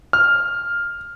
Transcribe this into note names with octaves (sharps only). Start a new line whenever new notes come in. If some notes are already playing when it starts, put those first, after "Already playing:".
F6